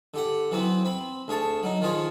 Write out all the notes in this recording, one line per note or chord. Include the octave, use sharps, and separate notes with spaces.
D3 G4 F#5
E3 F#3 B3 C4
C4 B5
D2 G#4 C#5 A5
F#3 D#4
D#3 F3 F4 G#4 C5 C#5